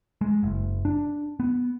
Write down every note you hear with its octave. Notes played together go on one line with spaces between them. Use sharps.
G#3
F#1
D4
B3